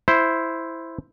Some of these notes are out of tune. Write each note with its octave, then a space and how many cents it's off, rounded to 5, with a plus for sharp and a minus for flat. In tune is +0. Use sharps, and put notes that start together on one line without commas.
E4 +0 C5 +0